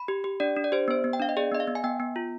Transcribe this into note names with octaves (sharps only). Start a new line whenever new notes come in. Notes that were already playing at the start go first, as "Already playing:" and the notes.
Already playing: B5
G4
G4
D4 D5
D4
D5
G4 C5
B3 C5
B3
G5
D4 F5
D#5
G#4 D5
B3 D#5
F5
B3
G#5
B3 G5
B3
F4